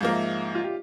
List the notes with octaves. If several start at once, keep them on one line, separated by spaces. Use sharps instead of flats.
G#2 F3 A#3 F5
E5
F5
F4
G4